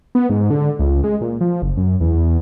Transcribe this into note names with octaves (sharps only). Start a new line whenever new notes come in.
B3
G#2
D3
C#2
G#3
A#2
F3
F#1
F#2
E2